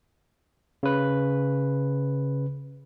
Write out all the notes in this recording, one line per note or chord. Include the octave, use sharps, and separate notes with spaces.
C#3 B4